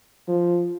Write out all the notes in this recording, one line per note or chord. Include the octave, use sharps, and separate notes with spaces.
F3